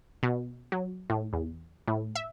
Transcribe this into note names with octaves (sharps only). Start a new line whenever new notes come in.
B2
F#3
A2
E2
A2
E5